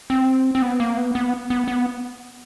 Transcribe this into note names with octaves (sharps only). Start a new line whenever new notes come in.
C4
C4
B3
A#3
B3
B3
B3
B3